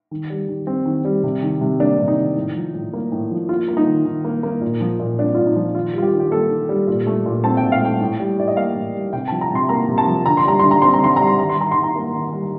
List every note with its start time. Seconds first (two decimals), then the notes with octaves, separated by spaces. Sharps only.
0.11 D#3
0.30 G3
0.48 D#3
0.67 C4
0.85 D#3
1.05 G3
1.24 C3
1.42 D#3
1.61 C3
1.80 A#3 D4
1.99 C3
2.08 D#4
2.18 D#3
2.36 A2
2.55 F3
2.74 A2
2.93 A#3
3.12 A2
3.31 F3
3.49 A#3 F4
3.68 A#3
3.77 D#4
3.87 D#3
4.05 D#3
4.25 A#3
4.43 A#3
4.61 A#2
4.81 F3
5.00 A#2
5.19 C4 D4
5.35 A#2 F4
5.47 D#4
5.56 F3
5.74 D#3 F4
5.94 G3 F4
6.02 G4
6.13 D#3
6.20 G4
6.31 A#3 A4
6.49 D#3
6.69 G3
6.88 A#2
7.07 A3
7.26 A#2
7.44 C4 A5
7.57 A#2 G5
7.72 F5
7.81 A3 G5
8.01 A2
8.20 G3
8.38 A2 D5
8.48 D#5
8.57 A#3 F5
8.75 A2
8.95 G3
9.13 C3 G5
9.28 F3 A5
9.41 A#5
9.50 C3 C6
9.69 A#3 A#5
9.88 C3
9.98 A5
10.07 F3
10.26 D3 A#5
10.37 C6
10.45 G3 A#5
10.59 D3 C6
10.71 A#5
10.82 C4 C6
10.94 A#5
11.01 D3 C6
11.16 G3 A#5
11.27 C6
11.39 D#3 A#5
11.49 C6
11.57 G3 A#5
11.72 D#3 C6
11.83 A#5
11.96 A#3
12.14 D#3
12.33 G3